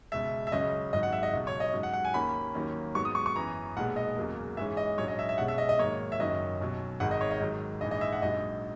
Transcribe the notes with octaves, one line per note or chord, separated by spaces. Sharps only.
C#2 B2 G#3 E5
E5
C#2 C#3 F#3 C#4 D#5
G#1 G#2 F#3 D#5
F#5
E5
D#5
C#2 B2 F#3
C#5
D#5
G#2 F#3 C#4
F#5
F#5
G#5
D#2 D#3 A#3 C#4 B5
D#2 D#3 F#3 A#3 C#4
G#2 F#3 B3 C#6
D#6
C#6
C#6
F#2 E3 B3 A#5
B1 A#2 G#3 B3 F#5
D#5
E2 C#3 F#3 A#3
G#2 E3 G#3 C#4 E5
D#5
A#1 G#2 F#3 C#4 C#5
D#5
E5
E5
B1 B2 G#3 C#4 F#5
E5
D#5
D#5
G#2 D#3 F#3 A#3 C#5
E5
F#1 F#2 D#3 F#3 C#4 D#5
B1 B2 F#3 C#4
G#1 G#2 D#3 G#3 F#5
D#5
C#5
D#5
G#2 D#3 F#3
A#1 G#2 E3 D#5
D#5
E5
F#5
A#1 G#2 F#3 D#5